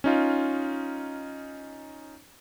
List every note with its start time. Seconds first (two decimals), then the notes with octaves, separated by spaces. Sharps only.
0.04 C#4 D#4 F4